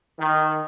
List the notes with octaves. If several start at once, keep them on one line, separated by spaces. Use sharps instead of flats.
D#3